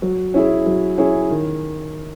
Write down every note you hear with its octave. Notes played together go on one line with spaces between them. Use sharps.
F#3
C#4 E4 G#4
F#3
C#4 E4 G#4
D#3